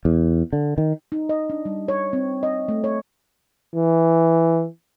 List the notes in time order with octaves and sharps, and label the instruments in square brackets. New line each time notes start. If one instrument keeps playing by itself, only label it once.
[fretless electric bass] E2
D3
D#3
[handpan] D#4
D#5
D4
G3
C#5
C4
D#5
A3
C#5
[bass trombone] E3